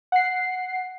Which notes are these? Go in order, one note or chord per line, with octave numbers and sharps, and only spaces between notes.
F#5 C7